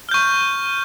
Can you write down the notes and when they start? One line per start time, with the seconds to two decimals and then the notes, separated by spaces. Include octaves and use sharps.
0.09 F6
0.11 G6
0.14 C#6